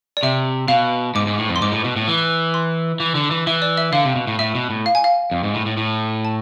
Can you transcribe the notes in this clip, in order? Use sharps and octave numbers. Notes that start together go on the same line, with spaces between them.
D5
C3 E5
B2 F5
G#2 D6
G#2
A2
F2
C6
G#2 D6
A2
B2
A2
E3
C6
E3
D3
E3
E3 E5
D5
E5
D3 F5
C3
B2
A2
A2 E5
B2
A2
F5
G#5
F5
F2
G#2
A2
A2
A2
A5